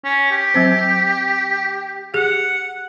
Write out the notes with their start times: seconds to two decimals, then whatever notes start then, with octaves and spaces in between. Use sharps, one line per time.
0.04 C#4
0.31 G4
0.54 F#3 C4 C5
2.14 G4 G#4 F#5